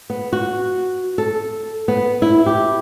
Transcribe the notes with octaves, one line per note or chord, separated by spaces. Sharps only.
B3
F#4
A4
B3
E4
G4